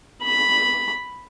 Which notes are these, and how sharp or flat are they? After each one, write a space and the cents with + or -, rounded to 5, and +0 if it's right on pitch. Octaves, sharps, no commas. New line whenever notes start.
B5 +0